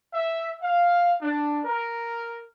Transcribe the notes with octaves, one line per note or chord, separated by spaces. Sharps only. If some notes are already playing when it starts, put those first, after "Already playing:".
E5
F5
D4
A#4